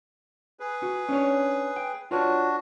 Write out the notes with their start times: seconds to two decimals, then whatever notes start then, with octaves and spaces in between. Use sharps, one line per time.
0.60 G#4 B4
0.83 F#4
1.09 C#4 D4 C#5
1.76 G5
2.11 D4 F4 F#4 B4 C#5